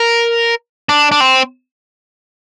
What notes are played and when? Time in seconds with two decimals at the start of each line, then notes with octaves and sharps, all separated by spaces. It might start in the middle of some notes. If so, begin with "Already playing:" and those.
Already playing: A#4
0.89 D4
1.12 D4
1.20 C4